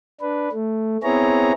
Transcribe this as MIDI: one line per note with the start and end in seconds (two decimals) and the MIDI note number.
0.21 0.49 62
0.21 0.49 71
0.52 0.97 57
1.03 1.52 59
1.03 1.52 60
1.03 1.52 64
1.03 1.52 68
1.03 1.52 73
1.03 1.52 82